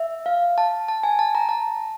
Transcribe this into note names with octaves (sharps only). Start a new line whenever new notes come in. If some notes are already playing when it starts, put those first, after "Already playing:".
Already playing: E5
F5
A5
A5
G#5
A5
A#5
A5